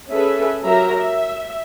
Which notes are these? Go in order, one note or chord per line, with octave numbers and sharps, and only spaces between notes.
C#4 G#4 A4 B4 E5
F#3 G4 A#4 E5 A#5
E5